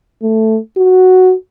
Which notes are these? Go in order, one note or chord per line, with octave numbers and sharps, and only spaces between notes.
A3
F#4